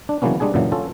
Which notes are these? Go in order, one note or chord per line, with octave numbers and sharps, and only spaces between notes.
D4
C#3 E3 F#3 A#3 B3 C#4
G3 G#3 D4 G#4 G#5
F#2 A#2 C#3 E3 F#3
C#4 F4 A4